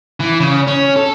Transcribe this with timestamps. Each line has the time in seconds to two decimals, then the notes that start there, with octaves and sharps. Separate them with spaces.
0.21 E3
0.40 C#3
0.67 C#4
0.96 A4